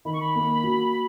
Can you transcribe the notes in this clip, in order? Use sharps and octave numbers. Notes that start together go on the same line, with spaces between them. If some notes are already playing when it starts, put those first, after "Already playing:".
D#3 B5
C#6
B5
A#3
F#3